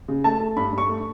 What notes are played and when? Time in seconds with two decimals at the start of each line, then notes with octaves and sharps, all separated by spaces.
0.08 C#3
0.24 A3 A5
0.40 A3
0.56 G2 B5
0.73 G2
0.78 C#6
0.89 A3